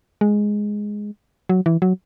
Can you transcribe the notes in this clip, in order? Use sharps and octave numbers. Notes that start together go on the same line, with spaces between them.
G#3
F#3
E3
F#3